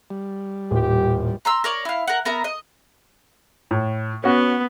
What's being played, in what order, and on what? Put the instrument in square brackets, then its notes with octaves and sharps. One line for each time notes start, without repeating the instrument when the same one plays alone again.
[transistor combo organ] G3
[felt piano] D#1 [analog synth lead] A2 [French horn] G4
[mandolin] A#5 C6 E6
A#4 C#5 D5
E4 F5
A#4 F#5
B3 A#4 E5 A#5
D#5
[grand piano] A2
[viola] B3 [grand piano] C#4 F#4